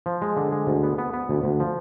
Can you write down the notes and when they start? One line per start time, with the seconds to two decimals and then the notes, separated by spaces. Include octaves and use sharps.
0.06 F3
0.22 G#3
0.37 D3
0.52 G#3
0.67 D2
0.83 B3
0.98 B3
1.13 B3
1.29 D2
1.44 D2
1.60 F3